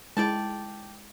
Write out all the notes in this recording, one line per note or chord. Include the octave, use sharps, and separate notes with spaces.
G#3 E4 D5 G5 A5